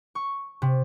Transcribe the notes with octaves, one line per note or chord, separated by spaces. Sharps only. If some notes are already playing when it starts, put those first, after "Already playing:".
C#6
C3